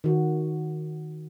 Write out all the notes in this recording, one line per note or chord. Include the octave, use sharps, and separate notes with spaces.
D#3 F#4